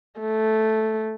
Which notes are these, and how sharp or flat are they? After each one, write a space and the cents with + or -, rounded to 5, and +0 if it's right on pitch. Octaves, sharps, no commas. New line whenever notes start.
A3 -5